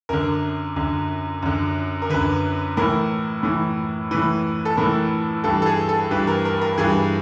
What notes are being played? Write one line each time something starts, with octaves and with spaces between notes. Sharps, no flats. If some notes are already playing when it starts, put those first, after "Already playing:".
F#2 D3 A#4
F#2 D3
F#2 D3
A#4
F#2 D3 B4
A2 E3 A#4
A2 E3
A2 E3 B4
A4
A2 E3 A#4
G2 E3 A4
A4
G#4
A4
G2 E3 B4
A#4
A#4
A#4
G2 E3 G#4